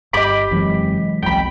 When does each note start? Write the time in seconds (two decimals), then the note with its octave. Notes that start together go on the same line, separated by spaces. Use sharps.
0.13 G1 G4 D#5 B5 D6 B6
0.51 E1 F#2 C3 E3 F#3 G#3
1.22 F1 B1 F2 G5 B5